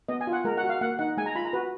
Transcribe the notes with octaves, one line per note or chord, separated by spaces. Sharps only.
B3 D#5
G#5
F4
F#5
G#3 A#4
F#5
F#4
F5
A#3 F#5
D#4 F#5
G#3 G#5
A#5
F4 B5
A#5
F#4 B4